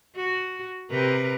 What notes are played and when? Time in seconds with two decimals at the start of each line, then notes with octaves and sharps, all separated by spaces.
0.16 F#4
0.90 C3 A#4 B4